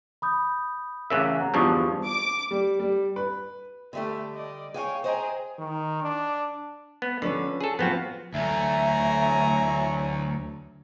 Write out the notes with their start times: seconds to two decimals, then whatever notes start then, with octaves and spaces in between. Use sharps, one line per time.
0.22 B5 D#6 G6
1.10 A1 C#3 A#4 E5 F#6
1.38 F#5 A#5
1.54 E2 G2 F3 A5 C#6 D#6
2.06 D6
2.51 G3
2.79 G3
3.16 B4
3.93 D3 G3 A3 G4 E5
4.35 D5 D#5
4.74 G#4 C#5 F5 G5 G#5
5.04 G#4 C5 D#5 G5 A#5
5.59 D#3
6.02 D4
7.02 B3
7.22 D3 F3 C#4 B4
7.61 G#4 A4
7.79 F3 B3 C4 F4 F#4
8.34 D2 E3 F#3 A3 E5 G#5 A#5